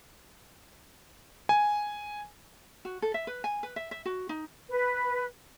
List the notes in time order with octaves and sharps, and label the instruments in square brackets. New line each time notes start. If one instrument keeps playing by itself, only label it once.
[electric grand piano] G#5
[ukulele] F#4
A4
E5
B4
G#5
B4
E5
E5
F#4
D#4
[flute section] B4